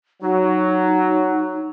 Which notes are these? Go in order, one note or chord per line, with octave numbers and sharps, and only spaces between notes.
F#3 D#4